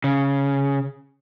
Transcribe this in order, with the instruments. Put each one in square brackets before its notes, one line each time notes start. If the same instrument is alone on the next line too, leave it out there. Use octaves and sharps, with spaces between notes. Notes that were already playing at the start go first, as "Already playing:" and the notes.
[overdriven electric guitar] C#3